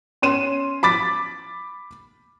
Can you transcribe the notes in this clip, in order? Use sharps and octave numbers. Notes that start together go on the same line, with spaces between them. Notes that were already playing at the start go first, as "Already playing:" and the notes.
C#4 C6 D#7 E7
B5 D6 A6 B6